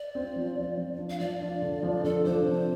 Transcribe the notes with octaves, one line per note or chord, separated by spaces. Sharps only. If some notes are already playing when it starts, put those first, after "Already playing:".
Already playing: D5
C4 F4
F3
C4 F4
F3
D4 F4
F5
F3 D5
D4 F4
D3
F3 D4
D3 A4
F3 D4 C5
C3